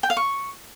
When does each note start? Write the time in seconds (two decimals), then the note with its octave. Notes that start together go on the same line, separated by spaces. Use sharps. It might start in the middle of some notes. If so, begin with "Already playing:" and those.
0.03 G5
0.10 F5
0.17 C#6